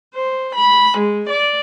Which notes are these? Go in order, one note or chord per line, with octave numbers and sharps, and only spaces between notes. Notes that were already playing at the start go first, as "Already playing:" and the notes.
C5
B5
G#3
D5